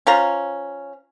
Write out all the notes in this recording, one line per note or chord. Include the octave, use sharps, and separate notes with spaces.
C#4 F4 C5 A#5